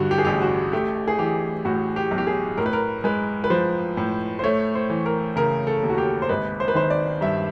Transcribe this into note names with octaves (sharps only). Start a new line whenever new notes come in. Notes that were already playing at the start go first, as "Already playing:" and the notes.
Already playing: G2 D3 F#3 F#4
G4
G#4
A1 G4
F#4
A3 G4
G#4
E3 G4
A2 F#4
G4
B1
G4
G#4
A2 A#4
B4
A#4
G#3 B4
B4
F3 C5
A2
C5
A3 C#5
C5
E3
A#4
C#3 A#4
A4
D#2
F#4
G4
C5
G#1 B4
C5
B4
D#3 C5
D5
G2 E5